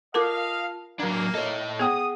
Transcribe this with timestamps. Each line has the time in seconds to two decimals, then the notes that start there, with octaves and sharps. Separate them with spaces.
0.14 F4 A4 A#4 D#5 F5 A5 D6
1.00 F#3 A#3 D4 A#5 G#6
1.35 A4 C#5 D#5
1.79 B3 G#4 F#5 G5 D#6